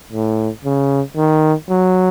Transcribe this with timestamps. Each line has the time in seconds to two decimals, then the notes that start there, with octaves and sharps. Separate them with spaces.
0.12 A2
0.64 C#3
1.16 D#3
1.69 F#3